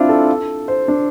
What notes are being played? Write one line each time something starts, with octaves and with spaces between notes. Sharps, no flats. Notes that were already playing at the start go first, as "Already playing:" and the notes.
Already playing: C4 D4 E4 F4
A4
C5
D4